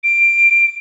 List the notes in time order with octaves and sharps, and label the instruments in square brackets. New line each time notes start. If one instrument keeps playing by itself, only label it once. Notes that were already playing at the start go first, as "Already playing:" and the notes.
[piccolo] D7